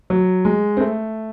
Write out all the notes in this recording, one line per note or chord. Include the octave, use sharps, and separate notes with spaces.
F#3
G#3
C4
A3